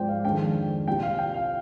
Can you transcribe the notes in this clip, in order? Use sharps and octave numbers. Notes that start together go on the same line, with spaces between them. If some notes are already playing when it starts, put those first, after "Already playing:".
Already playing: G#2 F3 G#3 C4 C5 D5 G5
F5
F2 D#3 G#3 D4 G5
C2 A#2 G3 G5
F5
G5
F5